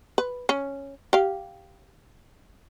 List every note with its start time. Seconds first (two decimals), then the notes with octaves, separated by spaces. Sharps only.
0.18 B4
0.49 C#4
1.13 G4 F5